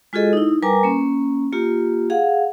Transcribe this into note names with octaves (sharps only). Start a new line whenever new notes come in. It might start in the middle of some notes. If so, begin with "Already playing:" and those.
G#3 F4 F#4 G#4 A4 D#5
D#4 E4
G3 A#4 B4 G#5 A#5 D6
A#3 C#4
A#3 F4 G4
G#4 F5 F#5